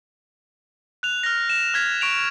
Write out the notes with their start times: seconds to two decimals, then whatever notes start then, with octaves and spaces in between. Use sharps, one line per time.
1.03 F#6 F7
1.23 F6 A#6
1.50 E7
1.74 F6 G#6 B6
2.01 C#6 D7 F7